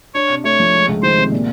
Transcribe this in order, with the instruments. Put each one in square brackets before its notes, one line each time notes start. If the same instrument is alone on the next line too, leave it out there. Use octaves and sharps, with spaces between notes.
[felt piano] D4 [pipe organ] C#5
[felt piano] C3
[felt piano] A3 [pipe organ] C#5
[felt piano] F3
G#3
C#2
[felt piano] D#3 [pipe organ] C5
[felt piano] C3
A#2